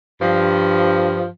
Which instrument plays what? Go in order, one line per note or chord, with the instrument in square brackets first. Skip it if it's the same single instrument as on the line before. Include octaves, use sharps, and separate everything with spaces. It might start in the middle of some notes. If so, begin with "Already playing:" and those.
[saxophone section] G2 F3